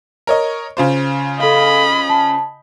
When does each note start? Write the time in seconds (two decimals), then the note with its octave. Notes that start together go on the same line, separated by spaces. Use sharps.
0.27 A#4 C#5 D#5
0.77 C#3 F4 C5
1.40 A4 D#5 F5 B5
2.09 A5